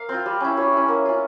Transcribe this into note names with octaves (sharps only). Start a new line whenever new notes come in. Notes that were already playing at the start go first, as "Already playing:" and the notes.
Already playing: A#3 F5
C4
F4
G3
C#4 E4
G3 C#5
C#4 E4
A#3
C#4 F4